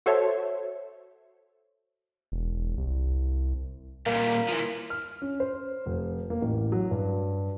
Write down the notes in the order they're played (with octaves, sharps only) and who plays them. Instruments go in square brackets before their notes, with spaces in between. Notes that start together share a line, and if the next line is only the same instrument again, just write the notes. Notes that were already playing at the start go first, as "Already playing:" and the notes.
[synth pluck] F#4 A4 C5 C#5 E5
[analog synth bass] E1
C2
[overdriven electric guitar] A#2 G3 [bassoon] A#3
[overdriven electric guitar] E3 F3
[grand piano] F6
C#4
C5
F1
A#3
A1
F#3
G2